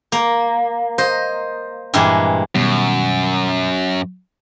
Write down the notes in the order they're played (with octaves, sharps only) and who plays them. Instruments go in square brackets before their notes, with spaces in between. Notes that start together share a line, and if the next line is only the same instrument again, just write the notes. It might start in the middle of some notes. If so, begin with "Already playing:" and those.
[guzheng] A#3
C5 D#5
G2 A#2 E3 G#3
[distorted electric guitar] F#2 [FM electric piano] B2 D#3 G3